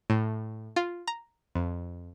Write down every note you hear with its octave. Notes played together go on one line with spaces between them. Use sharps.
A2
F4
A#5
F2